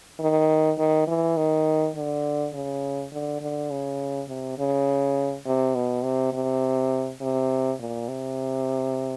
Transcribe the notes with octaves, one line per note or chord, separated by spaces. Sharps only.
D#3
D#3
E3
D#3
D3
C#3
D3
D3
C#3
C3
C#3
C3
B2
C3
C3
C3
A#2
C3